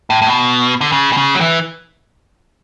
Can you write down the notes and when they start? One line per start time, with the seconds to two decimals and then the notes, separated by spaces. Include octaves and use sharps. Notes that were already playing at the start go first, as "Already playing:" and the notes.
0.10 A2
0.22 A2
0.27 B2
0.81 D3
0.92 C#3
1.13 B2
1.17 C#3
1.35 F#3
1.41 E3